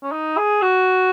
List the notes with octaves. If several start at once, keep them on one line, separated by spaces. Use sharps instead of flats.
C#4
D#4
G#4
F#4